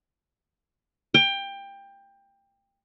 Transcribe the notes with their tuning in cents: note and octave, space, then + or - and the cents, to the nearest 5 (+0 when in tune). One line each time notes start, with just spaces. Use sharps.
G5 +20